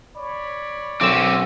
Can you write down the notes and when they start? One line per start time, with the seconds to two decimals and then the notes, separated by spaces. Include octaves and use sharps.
0.17 C#5 D5 B5
1.01 B1 C4 C#4 D6 E6